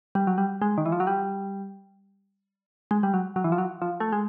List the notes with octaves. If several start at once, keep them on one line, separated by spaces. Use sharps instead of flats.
G3
F#3
G3
G#3
D#3
E3
F3
F#3
G3
G#3
G3
F#3
F#3
E3
F3
F#3
F3
A3
G#3